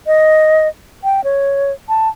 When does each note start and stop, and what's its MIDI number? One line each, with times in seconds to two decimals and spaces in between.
0.07 0.68 75
1.04 1.24 79
1.24 1.72 73
1.89 2.09 81